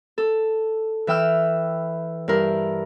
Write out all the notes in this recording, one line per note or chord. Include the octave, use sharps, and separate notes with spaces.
A4
E3 E5 G5 E6 F6
G2 E4 A#4